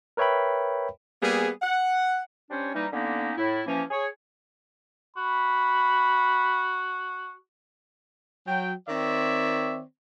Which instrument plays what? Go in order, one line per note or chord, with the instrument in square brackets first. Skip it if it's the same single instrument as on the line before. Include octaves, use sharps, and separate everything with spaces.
[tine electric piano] A#4 B4 C#5 E5 G5 B5
[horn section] G3 A#3 B3 G#4
F#5
[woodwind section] G3 C#4 D4 C5 C#5
E3 G3 A#3 D#4
D3 A#3 B3 C#4 D#4
A2 E4
E3 F3 A#3 C#4
G#4 C#5
[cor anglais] F#4 [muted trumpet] B5
[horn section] F#3 G5
D#3 C4 C#5 D5 E5